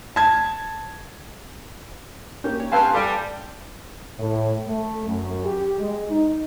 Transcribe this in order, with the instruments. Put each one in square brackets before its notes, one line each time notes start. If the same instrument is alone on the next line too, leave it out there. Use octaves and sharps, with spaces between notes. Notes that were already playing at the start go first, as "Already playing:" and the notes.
[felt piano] A5 G#6
[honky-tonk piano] A#3 C#4 [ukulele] G4
[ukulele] C#5 G5
[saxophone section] G2 C4 [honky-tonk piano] B4 F5 G#5 [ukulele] A5
[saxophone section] G3 [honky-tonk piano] A4 [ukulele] G#5
[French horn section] A2
A3
F#2
G4
G#3
D#4